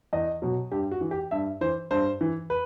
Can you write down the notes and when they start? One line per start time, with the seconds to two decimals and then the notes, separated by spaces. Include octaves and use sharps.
0.13 E2 D#5
0.42 B2 F#3
0.71 G2 G4
0.91 F#4
1.01 E3
1.11 G4
1.31 G2 E5
1.61 E3 C5
1.91 G2 C5
2.21 E3
2.50 B4